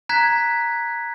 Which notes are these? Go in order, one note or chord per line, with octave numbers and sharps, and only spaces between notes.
A#5 F#6 G#6 B6